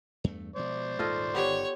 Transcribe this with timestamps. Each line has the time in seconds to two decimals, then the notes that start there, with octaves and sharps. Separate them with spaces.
0.24 E2 G2 A3
0.56 B2 F3 G#3 C5 D5
0.99 D#1 G#2 F4 A4 D#5
1.34 G1 D#3 B3 G4 C#5